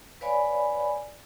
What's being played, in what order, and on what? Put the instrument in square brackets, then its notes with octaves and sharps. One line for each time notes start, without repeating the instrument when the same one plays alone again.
[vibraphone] B4 C#5 D5 F5 G#5 B5